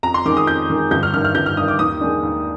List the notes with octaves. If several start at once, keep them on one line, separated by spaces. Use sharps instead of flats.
F2 A#5
C6
D#3 G#3 D6
D#6
F2 G6
D#3 G#3
G1 G6
F6
G2 D#3 F6
F6
G1 G6
F6
G2 D#3 D#6
D6
D#2 D#6
D#3 G#3 D4
D#2